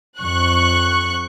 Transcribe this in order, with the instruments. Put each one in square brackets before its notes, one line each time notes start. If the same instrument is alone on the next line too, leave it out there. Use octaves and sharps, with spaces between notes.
[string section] F2 C#6 F#6